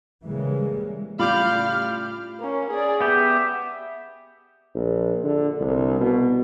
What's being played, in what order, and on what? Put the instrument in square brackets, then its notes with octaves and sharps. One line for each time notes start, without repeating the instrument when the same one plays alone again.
[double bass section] C#3 E3 G3 G#3 A#3
[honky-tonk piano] A2 C#3 G3 [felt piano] F4 [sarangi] F5 [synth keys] B5 D6 G6
[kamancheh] A#3 C#4
G#4 D5
[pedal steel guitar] B3 G4 [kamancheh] E5
[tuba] A#1
D3
C2
B2